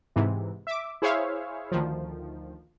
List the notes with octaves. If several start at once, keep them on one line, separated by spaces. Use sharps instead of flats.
G#2 C3 E3
E5 D6
E4 G#4 C5 C#5 E5 F5
D2 D#3 F3